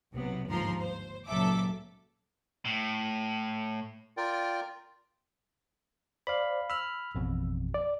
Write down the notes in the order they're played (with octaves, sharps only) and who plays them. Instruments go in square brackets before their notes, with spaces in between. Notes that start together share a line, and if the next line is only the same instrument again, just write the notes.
[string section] B1 C3 F#3 B3
G1 D#2 G#2 F3 A#5 C6
C5
C#2 A#2 F#3 A4 E5 D6
[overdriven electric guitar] A2
[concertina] F4 A#4 D5 G5
[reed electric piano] C5 D5 [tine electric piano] F5 B5
[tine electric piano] B5 F6 [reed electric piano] E6
[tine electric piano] A1 F2 B2
[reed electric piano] D5